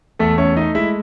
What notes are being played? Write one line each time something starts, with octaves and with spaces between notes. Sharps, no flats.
E2 A3 A4
A3 C#4 C#5
A3 D#4 D#5
G#3 E4 E5